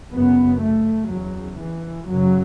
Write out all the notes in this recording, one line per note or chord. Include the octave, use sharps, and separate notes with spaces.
F#2 C#3 B3
A3
E2 C#3 F#3
E3
F#2 C#3 F#3